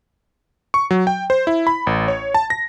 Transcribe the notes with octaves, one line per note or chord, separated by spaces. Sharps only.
C#6
F#3
G5
C5
E4
B5
A1
C#5
A5
A#6